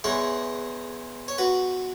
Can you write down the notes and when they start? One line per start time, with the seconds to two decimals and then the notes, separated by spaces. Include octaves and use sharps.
0.04 E2 E3 G#3 G#4 C#5
1.28 C#5
1.38 F#4 B4